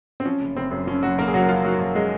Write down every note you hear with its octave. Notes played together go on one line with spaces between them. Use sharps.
C4
F3 C#4
F#1
F#1 C4
F#2
F3 C#4
F#1 F#3 F#4
F#1 A#3 A#4
G#4
F#2 F#3 F#4
F3 F4
F#1 F#3 F#4
F#1 F3 F4
G#3 G#4